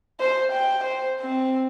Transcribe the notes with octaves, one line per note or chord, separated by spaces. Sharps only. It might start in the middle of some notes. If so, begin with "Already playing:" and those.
C5
G5
C5
C4